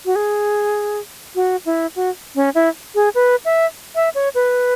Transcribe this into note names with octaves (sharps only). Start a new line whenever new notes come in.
F#4
G#4
F#4
E4
F#4
C#4
E4
G#4
B4
E5
E5
C#5
B4